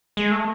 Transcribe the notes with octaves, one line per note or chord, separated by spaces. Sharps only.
G#3
A3